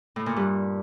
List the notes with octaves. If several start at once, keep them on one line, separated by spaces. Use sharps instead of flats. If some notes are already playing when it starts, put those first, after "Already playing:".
A2
A#2
G2